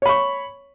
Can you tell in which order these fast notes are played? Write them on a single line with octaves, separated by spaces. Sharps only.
C#5 B5 C#6